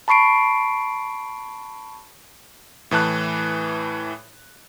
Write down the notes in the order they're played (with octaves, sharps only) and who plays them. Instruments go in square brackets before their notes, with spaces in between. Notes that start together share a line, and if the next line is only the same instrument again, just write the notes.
[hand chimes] A5 B5 C#6 C7 D7
[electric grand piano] A2 E3 A5 F#6